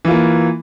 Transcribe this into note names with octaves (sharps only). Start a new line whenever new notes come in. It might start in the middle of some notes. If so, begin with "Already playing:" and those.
E3 A#3 F4